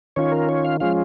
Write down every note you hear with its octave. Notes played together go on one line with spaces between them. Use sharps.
D#3 C#4 F4 C#5
A#4
C#5
F5
F3 G#3 C#4 F4 F5